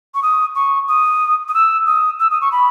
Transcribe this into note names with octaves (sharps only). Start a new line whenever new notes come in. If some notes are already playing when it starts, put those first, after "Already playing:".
C#6
D#6
C#6
D#6
D#6
E6
D#6
E6
D#6
C#6
B5